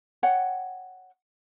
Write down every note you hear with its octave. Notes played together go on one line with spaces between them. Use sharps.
C#5 F#5 G5